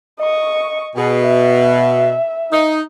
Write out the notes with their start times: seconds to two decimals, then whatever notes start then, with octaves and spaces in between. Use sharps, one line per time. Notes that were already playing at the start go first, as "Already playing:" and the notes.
0.21 D#5 C#6
0.96 B2 G#4
1.26 E5
2.52 D#4